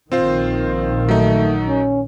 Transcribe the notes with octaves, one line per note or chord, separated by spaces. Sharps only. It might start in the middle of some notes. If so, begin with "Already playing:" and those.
A#1 A#2 D#3 C4 F4 C5
F#3 A3 D#4
C#4